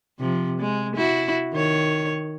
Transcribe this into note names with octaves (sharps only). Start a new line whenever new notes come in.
C3 F3
G#3
E4 F#4
D#3 C#5